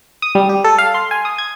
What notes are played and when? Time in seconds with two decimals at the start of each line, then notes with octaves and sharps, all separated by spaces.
0.22 D#6
0.35 G3
0.49 G4
0.64 A4
0.78 F5
0.94 C6
1.11 G#5
1.25 D#6
1.38 G#6